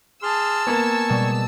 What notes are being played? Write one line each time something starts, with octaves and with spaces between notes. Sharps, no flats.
G#4 A5 C6 E6 F6
A#3 B3 G#5 C#6
B2 G3 G#3